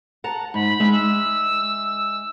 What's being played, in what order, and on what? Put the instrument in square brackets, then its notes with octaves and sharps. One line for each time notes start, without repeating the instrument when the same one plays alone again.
[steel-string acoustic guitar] F#5 A5 A#5
[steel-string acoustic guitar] G#2 [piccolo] B5
[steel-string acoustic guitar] G#3 D#4 E5
[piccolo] E6